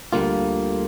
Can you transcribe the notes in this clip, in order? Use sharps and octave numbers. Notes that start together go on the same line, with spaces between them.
D2 D3 G3 A#3 F4